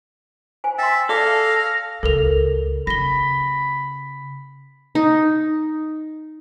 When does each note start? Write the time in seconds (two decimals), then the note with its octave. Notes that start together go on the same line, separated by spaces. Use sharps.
0.64 C5 G#5
0.78 E5 G5 C6 A6
1.09 A4 D5 F5 D6 A#6
2.03 C#2 A4 A#4 F7
2.87 C#3 B5 A#6 G7
4.95 D#4